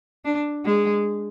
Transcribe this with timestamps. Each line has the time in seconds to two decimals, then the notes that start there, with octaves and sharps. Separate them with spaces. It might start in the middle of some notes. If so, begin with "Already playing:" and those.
0.25 D4
0.65 G#3